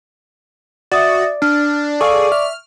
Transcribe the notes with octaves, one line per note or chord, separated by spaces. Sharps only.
F#4 D5 E5 D#6 A6
D4 F6
G#4 A4 D5 F5 C#6
E5 F6